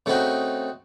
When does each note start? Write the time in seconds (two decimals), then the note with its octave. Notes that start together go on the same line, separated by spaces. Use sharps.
0.06 C#3 A3 C4 D#4 F#4